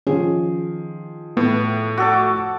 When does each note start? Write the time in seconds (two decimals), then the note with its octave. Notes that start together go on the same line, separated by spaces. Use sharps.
0.07 D#3 F3 C#4 G#4
1.37 A2 B3
1.98 F#4 A4 D6